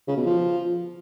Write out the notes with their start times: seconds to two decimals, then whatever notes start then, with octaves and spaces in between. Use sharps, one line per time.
0.08 C#3
0.17 B2
0.26 F3